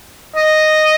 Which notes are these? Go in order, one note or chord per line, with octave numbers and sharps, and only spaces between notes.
D#5